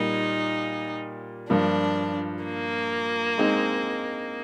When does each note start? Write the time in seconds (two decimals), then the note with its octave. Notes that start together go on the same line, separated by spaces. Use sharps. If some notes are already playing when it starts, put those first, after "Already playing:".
Already playing: A#2 G3 A#3 D#4
1.50 G2 F3 A#3 D4
2.44 A#3
3.38 G#3 C4 D#4